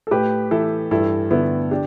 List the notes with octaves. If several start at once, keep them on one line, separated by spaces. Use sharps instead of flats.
A4
A2 G4 B4
E3 E4 A4
G2 E4 A4
D3 B3 E4
D4 G4